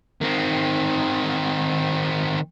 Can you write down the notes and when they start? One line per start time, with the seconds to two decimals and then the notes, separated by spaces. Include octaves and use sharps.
0.21 D#3 C4